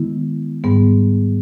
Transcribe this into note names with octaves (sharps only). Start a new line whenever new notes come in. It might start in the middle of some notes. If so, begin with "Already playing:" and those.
Already playing: D#3 G#3 B3 E4
G#2 G3 B3